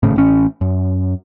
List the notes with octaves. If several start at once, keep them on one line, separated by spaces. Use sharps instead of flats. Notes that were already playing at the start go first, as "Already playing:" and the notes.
G#1 A2 C#3
A1 C#4
F#2